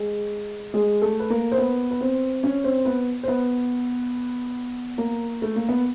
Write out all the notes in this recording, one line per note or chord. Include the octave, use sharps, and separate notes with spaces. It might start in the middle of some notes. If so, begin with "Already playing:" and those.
Already playing: G#3 G#4
G#3 G#4
A3 A4
B4
A#3 A#4
C5
B3 B4
B4
C4 C5
C#4 C#5
C4 C5
B3 B4
C5
B3 B4
A#3 A#4
A3
A#3
B3